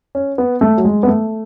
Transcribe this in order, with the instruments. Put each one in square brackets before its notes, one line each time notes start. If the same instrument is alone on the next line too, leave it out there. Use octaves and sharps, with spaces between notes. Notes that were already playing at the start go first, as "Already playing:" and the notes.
[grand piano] C#4
B3
A3
F#3
G#3
B3
A3